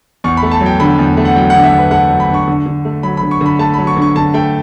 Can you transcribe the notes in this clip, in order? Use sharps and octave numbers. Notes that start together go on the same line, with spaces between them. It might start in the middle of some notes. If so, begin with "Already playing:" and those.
E2 C#6
B5
A3
A5
F#3
G5
D3 B5
E2
A3
F#5
F#3 G5
D3 F#5
E5
E2
B4
A3 F#5
F#3
B5
D3 C#6
D3
D3
A3
F#3 B5
B5
D3
C#6
D3 B5
A3 A5
F#3 B5
C#6
D3
C#6
D3 A5
A3 G5